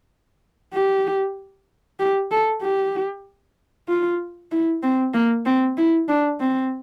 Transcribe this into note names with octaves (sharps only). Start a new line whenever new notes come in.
G4
G4
A4
G4
F4
E4
C4
A#3
C4
E4
D4
C4